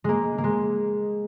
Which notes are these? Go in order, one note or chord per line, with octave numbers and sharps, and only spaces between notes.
G#3 A#3
A#3
G#3